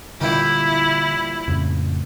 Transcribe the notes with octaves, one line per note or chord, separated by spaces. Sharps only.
A#2 D3 E3 G3 E4
F2 A2 C#3